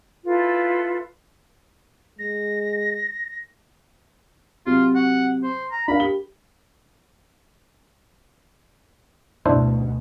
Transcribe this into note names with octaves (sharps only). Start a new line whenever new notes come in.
E4 F4 A4 B4
G#3 A#6
C3 F#3 F4
F#5
C5
A#5
D4 A#4 F5 B5
G4 G7
D2 B2 D4 E4 C5